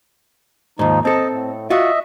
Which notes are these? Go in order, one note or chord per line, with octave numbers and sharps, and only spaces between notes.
D#2 G#2 F3 D#4
C4 A4 D#5 A5
A2
F4 F#4 D#5 E5